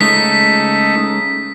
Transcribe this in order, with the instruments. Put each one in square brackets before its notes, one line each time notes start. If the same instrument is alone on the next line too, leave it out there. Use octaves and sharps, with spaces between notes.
[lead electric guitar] G#3 C#4 [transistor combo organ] A3 D#4 [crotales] B6